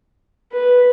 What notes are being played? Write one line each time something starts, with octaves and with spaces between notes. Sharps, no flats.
B4